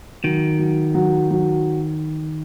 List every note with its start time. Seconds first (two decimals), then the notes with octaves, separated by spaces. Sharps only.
0.23 D#3 F#3
0.59 F#3
0.95 F#3
1.31 F#3